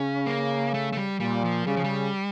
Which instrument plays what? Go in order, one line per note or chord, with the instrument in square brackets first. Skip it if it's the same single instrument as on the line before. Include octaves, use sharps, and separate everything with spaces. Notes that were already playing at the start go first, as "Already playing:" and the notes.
Already playing: [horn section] C#3 [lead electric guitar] C#4
[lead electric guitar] A#3
A3
A3
G3
[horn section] A#2 [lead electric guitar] G3
[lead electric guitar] F3
[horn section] C#3 [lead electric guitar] G3
[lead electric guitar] F3
G3